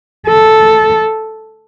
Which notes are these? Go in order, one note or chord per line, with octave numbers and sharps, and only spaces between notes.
A4